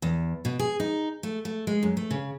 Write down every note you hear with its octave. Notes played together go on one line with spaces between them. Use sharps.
E2
B2
G#4
D#4
A3
A3
G#3
F#2
A3
C#3